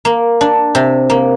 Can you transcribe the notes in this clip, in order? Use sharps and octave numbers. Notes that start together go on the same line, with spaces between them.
A#3
D4
C3
A#3